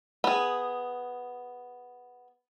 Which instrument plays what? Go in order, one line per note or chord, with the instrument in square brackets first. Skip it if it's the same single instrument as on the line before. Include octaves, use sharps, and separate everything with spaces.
[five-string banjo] B3 G#4